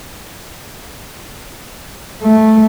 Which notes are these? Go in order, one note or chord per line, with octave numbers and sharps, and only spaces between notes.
A3